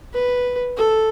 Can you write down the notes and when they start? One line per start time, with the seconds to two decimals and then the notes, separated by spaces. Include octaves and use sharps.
0.13 B4
0.77 A4